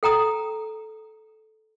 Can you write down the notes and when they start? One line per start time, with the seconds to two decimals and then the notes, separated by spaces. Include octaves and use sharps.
0.03 A4 G5 A#5 D#6